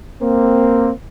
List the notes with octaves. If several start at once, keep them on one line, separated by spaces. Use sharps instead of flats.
A#3 C4